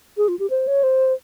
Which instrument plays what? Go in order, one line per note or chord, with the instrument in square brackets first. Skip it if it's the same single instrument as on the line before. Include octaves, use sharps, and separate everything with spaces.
[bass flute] G#4
F4
G4
C5
C#5
C5